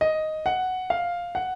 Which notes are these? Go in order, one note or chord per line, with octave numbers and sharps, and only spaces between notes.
D#5
F#5
F5
F#5